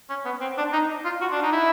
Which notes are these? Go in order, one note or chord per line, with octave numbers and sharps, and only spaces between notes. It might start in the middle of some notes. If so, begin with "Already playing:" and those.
C#4
B3
C4
D4
D#4
F4
F#4
D4
D#4
E4